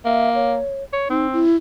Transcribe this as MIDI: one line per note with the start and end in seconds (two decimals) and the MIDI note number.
0.05 0.60 58
0.05 0.30 76
0.35 0.83 73
0.93 1.07 73
1.10 1.45 60
1.10 1.27 63
1.33 1.56 64